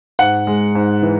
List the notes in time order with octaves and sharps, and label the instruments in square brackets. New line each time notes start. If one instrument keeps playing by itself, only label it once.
[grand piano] G#2 F#5
G#3
G#2
E3